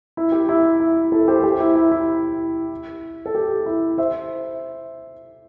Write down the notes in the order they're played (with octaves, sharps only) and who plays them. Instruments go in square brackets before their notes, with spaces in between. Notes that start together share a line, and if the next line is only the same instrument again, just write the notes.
[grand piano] E4
G4
E4
E4
E4 A4
G4 C5
G4
E4
E4
E4
A4
G4
E4
C5 E5